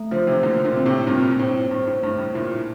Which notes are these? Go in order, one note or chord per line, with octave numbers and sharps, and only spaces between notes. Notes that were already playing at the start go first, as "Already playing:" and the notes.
Already playing: A3
D3 F3 C5
C3 E3
A#2 D3 A3
A#2 D3
C4
A2 C3
G2 A#2 C4
A2 C5
G2 C5
A2
G2 A3
A2
G2 A#2 E4